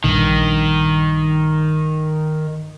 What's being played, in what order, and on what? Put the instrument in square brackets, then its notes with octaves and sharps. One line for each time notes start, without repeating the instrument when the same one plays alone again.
[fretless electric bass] A#1 G2 [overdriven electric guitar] D#3